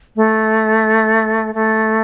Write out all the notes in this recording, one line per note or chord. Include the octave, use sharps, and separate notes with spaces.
A3
A3